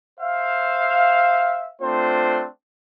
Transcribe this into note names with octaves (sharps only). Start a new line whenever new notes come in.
C5 E5 F5
A3 C4 D4 F4 C5